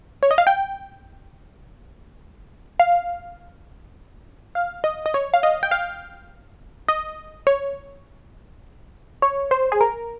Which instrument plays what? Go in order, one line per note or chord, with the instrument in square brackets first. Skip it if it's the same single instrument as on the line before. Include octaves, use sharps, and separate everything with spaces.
[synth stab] C#5
D#5
F5
G5
F5
F5
D#5
D#5
C#5
F5
D#5
G5
F5
D#5
C#5
C#5
C5
G#4
A#4